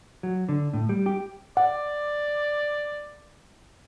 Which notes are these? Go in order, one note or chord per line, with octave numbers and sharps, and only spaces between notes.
F#3
D3
A2
G3
G4
D5 F#5